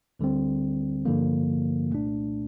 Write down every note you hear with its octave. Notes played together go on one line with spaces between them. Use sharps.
D2 D3 G3 C4
G2 D3 F3 A#3
C2 A#2 A3 D4